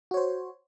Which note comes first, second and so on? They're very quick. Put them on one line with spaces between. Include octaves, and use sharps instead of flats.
F#4 C#5 C5